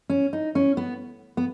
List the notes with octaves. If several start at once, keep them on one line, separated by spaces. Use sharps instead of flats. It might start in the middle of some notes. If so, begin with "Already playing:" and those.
C#4
D#4
C#4
B3
B3